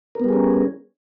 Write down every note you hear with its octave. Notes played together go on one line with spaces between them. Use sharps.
G3 B3 C#4 G#4 A#4